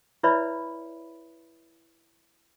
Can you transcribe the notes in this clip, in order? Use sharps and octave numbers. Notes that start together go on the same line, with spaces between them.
E4 B4 C#5 D5 E5 B5